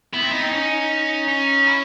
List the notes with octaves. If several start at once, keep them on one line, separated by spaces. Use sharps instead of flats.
B3 E4
C4
B3 D#4
C4
C#4
D#4
E4